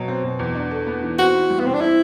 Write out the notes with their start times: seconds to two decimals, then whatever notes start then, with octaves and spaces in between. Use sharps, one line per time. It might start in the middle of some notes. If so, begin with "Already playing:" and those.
Already playing: B2 F#3
0.08 C4
0.23 B2
0.39 E2
0.55 D4
0.71 A4
0.87 B3
1.03 E3
1.18 C4 F#4
1.34 E4
1.50 G3
1.60 B3
1.66 C3 C4
1.74 D4
1.81 C4 E4